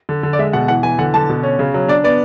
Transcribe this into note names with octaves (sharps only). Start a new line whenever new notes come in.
D3
D3
D5
G#3 E5
B2 F#5
E3 F#5
E3 G#5
D3 F#5
D3 A5
B2
C#4
C#3
F#3
D4 D5
B3 D5